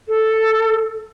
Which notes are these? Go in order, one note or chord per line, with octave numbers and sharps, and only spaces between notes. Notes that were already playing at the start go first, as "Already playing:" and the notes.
A4